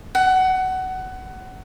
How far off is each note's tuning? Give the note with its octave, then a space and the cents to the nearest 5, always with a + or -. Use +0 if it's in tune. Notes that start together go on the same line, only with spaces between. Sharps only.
F#5 +20